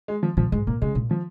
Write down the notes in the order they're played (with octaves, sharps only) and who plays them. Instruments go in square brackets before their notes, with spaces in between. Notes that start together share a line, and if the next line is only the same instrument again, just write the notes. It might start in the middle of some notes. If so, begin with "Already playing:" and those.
[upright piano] G#3
F3
[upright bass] A#2 [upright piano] F3
[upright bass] G#2 [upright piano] G#3
[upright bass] A#2 [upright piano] A#3
[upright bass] C#3 [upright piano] G#3
[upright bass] A#2
[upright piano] F3